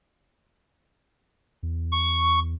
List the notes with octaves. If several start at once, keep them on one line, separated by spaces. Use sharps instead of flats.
E2
C#6